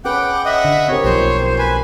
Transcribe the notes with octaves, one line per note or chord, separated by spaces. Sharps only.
C#4 G#4 B4 F#5 G5 D6
D#5 E5 F#5 D#6
D3
C4 G4 A#4 C#5
B1 F3 A#3 B3 C5
B4 G#5